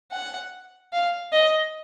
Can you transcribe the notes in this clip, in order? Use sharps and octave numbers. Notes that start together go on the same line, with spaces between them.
F#5
F5
D#5